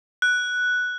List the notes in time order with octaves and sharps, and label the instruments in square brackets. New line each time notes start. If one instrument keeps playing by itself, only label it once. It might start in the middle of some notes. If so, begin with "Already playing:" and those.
[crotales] F#6